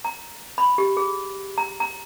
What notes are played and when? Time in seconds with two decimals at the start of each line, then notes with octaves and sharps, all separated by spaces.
0.05 A#5
0.58 B5
0.78 G4
0.97 G#4
1.58 A#5
1.80 A#5